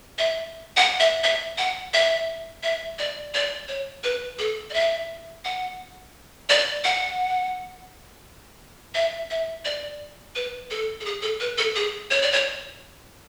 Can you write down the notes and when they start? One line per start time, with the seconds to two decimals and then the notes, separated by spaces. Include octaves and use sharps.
0.18 E5
0.77 F#5
1.00 E5
1.24 E5
1.58 F#5
1.94 E5
2.63 E5
2.99 D5
3.34 D5
3.68 C#5
4.04 B4
4.39 A4
4.70 D5
4.74 E5
5.45 F#5
6.49 D5
6.84 F#5
8.95 E5
9.30 E5
9.65 D5
10.35 B4
10.71 A4
11.01 A4
11.05 G#4
11.22 A4
11.40 B4
11.58 A4
11.76 G#4
12.11 C#5
12.22 D5
12.32 C#5